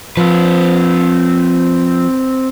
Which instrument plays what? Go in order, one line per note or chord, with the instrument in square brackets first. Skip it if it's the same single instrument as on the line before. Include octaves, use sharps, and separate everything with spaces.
[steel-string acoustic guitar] F3 [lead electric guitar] C4 B4